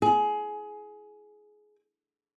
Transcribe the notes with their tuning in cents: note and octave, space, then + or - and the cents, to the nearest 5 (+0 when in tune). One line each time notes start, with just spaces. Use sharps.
G#4 +20